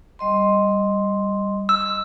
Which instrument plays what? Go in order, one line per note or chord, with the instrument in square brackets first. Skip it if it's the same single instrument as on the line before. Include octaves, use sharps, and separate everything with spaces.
[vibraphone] G3 D#5 C6
[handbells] E6